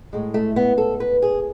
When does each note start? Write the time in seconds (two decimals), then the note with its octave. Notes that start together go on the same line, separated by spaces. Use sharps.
0.13 A2 G#3
0.34 A3
0.56 B3
0.78 A4
1.00 B4
1.22 G#4